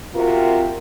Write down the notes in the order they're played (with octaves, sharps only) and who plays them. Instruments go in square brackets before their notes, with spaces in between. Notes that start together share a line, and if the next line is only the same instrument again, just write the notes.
[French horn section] C3 C4 F4 F#4 A#4